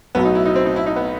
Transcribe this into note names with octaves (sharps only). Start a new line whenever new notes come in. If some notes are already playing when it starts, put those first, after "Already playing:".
B1 A2 F#3 B3
D#4
E4
D#4
C4
D#4
E4
D#4
B3